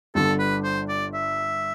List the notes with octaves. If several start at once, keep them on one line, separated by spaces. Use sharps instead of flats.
G1 G2 D3 A4
B4
C5
D5
E5